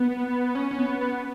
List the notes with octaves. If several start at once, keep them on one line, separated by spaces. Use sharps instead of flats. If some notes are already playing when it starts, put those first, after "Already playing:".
Already playing: B3
C#4
C#4
B3
B3